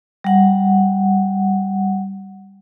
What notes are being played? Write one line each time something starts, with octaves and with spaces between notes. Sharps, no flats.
G3 F#5